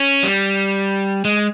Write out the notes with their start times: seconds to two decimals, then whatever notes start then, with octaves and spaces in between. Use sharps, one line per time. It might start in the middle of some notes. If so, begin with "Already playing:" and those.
Already playing: C#4
0.23 G3
1.25 G#3